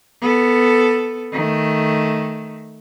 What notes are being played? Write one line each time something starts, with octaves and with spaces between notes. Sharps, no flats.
B3 A4
D#3 A3